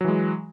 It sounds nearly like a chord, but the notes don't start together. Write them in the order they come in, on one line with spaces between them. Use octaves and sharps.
F#3 E3 G#3